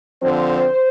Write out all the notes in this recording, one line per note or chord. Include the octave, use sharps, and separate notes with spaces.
D3 F3 C4 C5